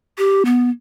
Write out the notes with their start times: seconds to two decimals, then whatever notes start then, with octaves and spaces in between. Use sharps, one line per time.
0.18 G4
0.45 B3